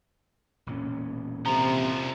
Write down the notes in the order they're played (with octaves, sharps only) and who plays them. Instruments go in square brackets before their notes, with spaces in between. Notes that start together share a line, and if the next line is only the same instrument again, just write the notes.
[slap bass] E1 A#2 C#4
[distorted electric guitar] C2 F3 [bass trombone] C3 [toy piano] A#5